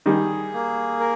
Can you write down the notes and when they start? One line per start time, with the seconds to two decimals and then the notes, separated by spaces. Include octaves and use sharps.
0.06 D#3 G3 G#4
0.54 A#3
1.00 A#4